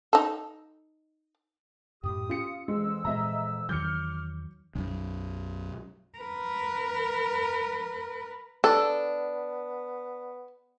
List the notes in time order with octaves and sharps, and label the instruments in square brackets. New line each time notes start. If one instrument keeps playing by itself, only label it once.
[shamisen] D#4 A4
[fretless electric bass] F#2 A2 [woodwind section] G4 D#6
[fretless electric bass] C#4 [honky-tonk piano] F4 C#7
[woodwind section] F2 E3 E6 [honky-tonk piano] G#3
[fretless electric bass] A#2 G#3 [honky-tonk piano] D#5 E5 A#5
[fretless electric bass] E2 D#3 F#3 [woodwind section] D6 F6 [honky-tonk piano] G6 C#7
[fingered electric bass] B1 F#2
[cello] A#4 B4
[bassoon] B3 [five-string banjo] D4 [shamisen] A4